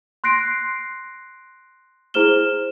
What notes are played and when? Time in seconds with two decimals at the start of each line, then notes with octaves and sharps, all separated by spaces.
0.24 C6 F#6 A#6 C7 D7
2.14 E4 G#4 C5 F6 E7 G7